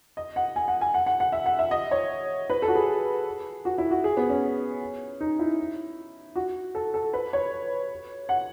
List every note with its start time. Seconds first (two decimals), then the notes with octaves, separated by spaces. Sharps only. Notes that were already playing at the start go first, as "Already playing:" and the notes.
0.17 D#5
0.36 F#5
0.56 G#5
0.68 F#5
0.81 G#5
0.94 F#5
1.06 F#5
1.20 F#5
1.32 E5
1.46 F#5
1.59 E5
1.71 D#5
1.91 C#5
2.50 B4
2.62 A4
2.68 F#4
2.75 G#4
3.65 F#4
3.78 E4
3.91 F#4
4.04 G#4
4.17 B3
4.30 C#4
5.20 D#4
5.39 E4
6.36 F#4
6.75 A4
6.94 A4
7.13 B4
7.33 C#5
8.29 F#5